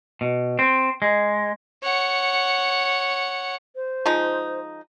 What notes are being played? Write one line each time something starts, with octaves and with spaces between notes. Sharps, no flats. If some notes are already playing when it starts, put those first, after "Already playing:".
B2
C4
G#3
C#5 F#5
C5
F3 G#3 D#4